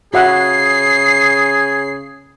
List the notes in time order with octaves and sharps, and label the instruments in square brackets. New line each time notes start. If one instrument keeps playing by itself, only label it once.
[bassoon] C#3 [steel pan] F#4 E5 F#5 [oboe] G#4 [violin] C7